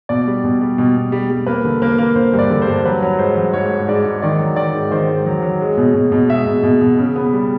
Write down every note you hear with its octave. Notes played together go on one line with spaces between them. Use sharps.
B2 D5
G3
B2
G3
B2
B2
G3
G3
A#3 B4
D3
A#3 B4
A#3
D3 C5
G2 D5
D3
C5
G2
F#3 B4
F#3
G#2 C5
F#3
G#2 C#5
G#2
G#2 D5
G#2
D#3 D5
F#3
D#3 D5
G#2
D#3 C5
G#2
F#3
F#3
G#3
B2
B2
B2
G#3 E5
B2
B2
B2
C#3
B3
G3